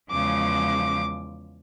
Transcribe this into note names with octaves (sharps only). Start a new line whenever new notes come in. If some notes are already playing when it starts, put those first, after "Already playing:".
E2 C#3 F3 G#3 D6